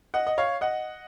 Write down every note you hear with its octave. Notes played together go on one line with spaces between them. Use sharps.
D#5 F#5
D#5
C#5 F5
D#5 F#5